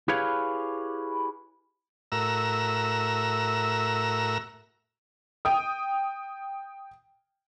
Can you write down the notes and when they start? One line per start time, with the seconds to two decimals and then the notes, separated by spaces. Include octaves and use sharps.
0.08 E4 G4 G#4 B4 C#5 F5
2.12 A2 F#4 A#4 E5 A#5 E6
5.45 G5 D#6